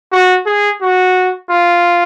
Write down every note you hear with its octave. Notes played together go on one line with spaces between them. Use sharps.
F#4
G#4
F#4
F4